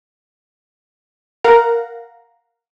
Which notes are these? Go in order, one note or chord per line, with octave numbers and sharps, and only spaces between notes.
A#4 F5 F#5 A#5